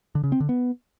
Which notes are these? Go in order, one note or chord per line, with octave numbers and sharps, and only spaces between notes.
D3
C#3
C4
D3
B3